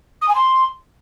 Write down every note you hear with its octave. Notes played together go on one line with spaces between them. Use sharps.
D#6
G#5
C6